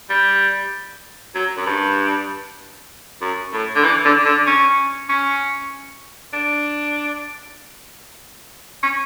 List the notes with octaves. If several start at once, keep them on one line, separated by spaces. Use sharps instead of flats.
G3
F#3
F#2
G2
F#2
A2
D3
E3
D3
D3
C#4
C#4
D4
C#4